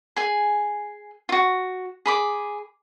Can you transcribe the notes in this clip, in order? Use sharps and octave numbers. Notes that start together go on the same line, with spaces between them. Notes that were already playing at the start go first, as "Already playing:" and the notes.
G#4 G#5
F4 F#4
G#4 B5 D6